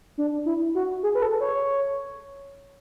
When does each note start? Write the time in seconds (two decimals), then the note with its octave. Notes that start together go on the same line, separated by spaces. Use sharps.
0.18 D4
0.46 E4
0.75 F#4
1.03 G#4
1.15 B4
1.22 A4
1.40 C#5